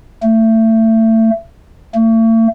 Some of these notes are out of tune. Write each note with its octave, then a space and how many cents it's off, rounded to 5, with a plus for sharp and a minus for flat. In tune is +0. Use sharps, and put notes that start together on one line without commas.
A3 +25
A3 +40